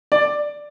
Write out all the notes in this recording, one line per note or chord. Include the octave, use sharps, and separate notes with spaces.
D5